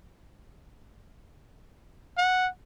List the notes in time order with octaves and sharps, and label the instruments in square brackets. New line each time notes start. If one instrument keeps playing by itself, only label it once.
[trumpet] F#5